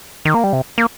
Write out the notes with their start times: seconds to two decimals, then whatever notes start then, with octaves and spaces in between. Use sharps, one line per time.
0.25 D#3
0.34 A#3
0.44 G3
0.53 C3
0.78 A#3